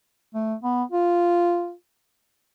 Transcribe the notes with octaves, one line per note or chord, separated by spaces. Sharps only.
A3
B3
F4